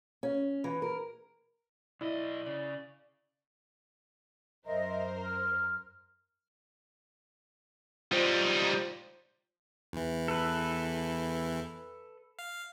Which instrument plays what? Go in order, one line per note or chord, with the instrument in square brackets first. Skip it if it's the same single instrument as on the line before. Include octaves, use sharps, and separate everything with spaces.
[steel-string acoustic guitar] C#4
E3
A#4
[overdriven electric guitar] B1 D#5 [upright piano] E4 [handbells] D5
[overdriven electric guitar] C#3 [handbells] D5
[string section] F#2 A#4 C5 [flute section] D#5 E5
[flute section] F6
[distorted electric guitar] G3 D#4 [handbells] F4 C5
[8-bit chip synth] E2 E3
[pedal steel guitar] A4 B4
[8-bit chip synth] F5